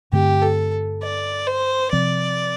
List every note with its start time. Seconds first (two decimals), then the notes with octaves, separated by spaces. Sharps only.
0.12 G2 D3 A3 C4 G4
0.42 A4
1.03 D5
1.47 C5
1.93 C3 F3 C4 D5